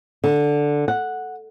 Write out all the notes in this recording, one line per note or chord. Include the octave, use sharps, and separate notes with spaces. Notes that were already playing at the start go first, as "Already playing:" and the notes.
D3
F#5